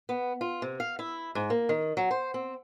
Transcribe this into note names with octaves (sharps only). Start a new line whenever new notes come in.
B3
F4
C3
F5
E4
G#2
A#3
D#3
F#3
C5
C4